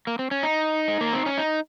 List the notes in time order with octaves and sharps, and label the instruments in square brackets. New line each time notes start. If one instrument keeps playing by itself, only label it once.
[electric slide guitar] A#3
C4
C#4
D#4
G#3
A#3
C4
C#4
D#4